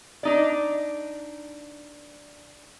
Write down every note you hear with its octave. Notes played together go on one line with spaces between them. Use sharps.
D4 D#4 D5